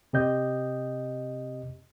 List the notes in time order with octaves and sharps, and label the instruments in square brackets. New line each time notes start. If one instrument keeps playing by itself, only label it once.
[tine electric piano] C3 G4 D#5 G6